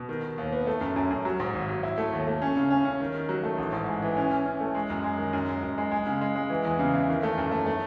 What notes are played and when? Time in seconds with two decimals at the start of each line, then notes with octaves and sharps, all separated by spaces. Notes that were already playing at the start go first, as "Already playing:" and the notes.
Already playing: B2
0.09 D#3
0.23 D#3
0.38 D#2
0.52 B3
0.67 A3
0.81 F#2
0.96 F#2
1.11 F#2
1.25 F#3
1.40 G#2
1.54 G#1
1.69 F#3
1.83 E4
1.98 A3
2.13 D#2
2.27 A3
2.42 C#4
2.57 C#3
2.70 C#4
2.85 C#4
3.00 D#3
3.14 D#3
3.29 F#3
3.43 A3
3.58 A1
3.73 G#2
3.88 G#3
4.02 E3
4.17 C#4
4.31 C#4
4.46 C#4
4.60 A3
4.75 G#3
4.90 F#2
5.04 G#3
5.18 D#3
5.33 F#2
5.48 G#3
5.63 F#2
5.78 G#3
5.92 G#3
6.07 C#3
6.21 G#3
6.36 G#3
6.50 E3
6.65 E2
6.79 C#3
6.94 E3
7.09 D#3
7.23 A3
7.38 F#2
7.52 A3
7.66 A3